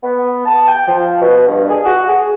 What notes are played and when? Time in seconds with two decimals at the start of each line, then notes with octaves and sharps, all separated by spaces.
0.03 B3
0.46 A5
0.67 G5
0.87 F3
1.21 B2
1.47 G2
1.69 G#4
1.85 F#4
2.09 G#4